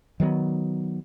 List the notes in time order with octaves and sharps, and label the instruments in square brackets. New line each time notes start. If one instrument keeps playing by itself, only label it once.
[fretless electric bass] D#3 F#3 G#3 B3